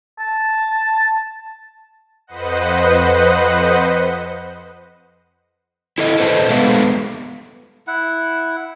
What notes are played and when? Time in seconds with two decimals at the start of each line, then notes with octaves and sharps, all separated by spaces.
0.19 A5
2.27 F2 B4 C5 D#5 F#5
5.98 E4 A4 D#5
6.19 A4 B4 C5 D#5 F#5 A5
6.50 G#3 B3 A4 B4 E5 F5
7.87 E4 F#5